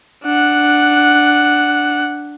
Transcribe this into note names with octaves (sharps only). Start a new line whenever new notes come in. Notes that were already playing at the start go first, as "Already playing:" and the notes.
D4 F#5